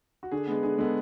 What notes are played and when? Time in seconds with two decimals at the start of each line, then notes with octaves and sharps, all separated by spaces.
0.23 F#4
0.31 D3 G#4
0.47 G#3 B3
0.63 D3 G#4
0.78 G#3 B3 A4